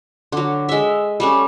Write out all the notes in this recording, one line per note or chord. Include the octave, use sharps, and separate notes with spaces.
D3 F#3
G#3 E5
G3 A3 C#4